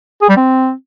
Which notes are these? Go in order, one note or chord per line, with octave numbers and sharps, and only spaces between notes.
G#4
G3
C4